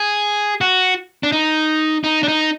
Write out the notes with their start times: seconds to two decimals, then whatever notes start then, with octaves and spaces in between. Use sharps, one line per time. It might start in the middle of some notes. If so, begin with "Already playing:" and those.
Already playing: G#4
0.61 F#4
1.23 D4
1.32 D#4
2.04 D#4
2.23 D4
2.28 D#4